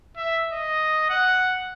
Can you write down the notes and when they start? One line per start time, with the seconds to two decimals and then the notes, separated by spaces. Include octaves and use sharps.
0.16 E5
0.52 D#5
1.10 F#5